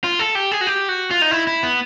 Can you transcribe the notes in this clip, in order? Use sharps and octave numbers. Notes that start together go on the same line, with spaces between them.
F4
A4
G4
G#4
F#4
G4
F#4
F4
D#4
E4
E4
B3